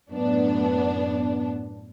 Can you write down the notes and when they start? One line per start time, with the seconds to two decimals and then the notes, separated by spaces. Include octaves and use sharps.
0.12 F#2 A2 B3 D4